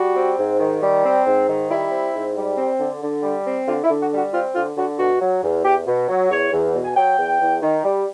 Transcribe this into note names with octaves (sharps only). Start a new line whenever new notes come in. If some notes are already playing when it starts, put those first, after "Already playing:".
Already playing: G3 F#4
C4
G#2
D#3
G3
C4
G#2
D#3
G3 E4
C4
G#2
G3
C4
D3
D3
G3
C4
D3 F4
E4
D3
F#4
G3
F#4
C4 F4
D3 F4
D3 F#4
B2 F#4
F#3
E2
E2 G4
B2
F#3
E2 C#5
E2
B2
G#5
F#3 G5
E2
E2
D#3
G3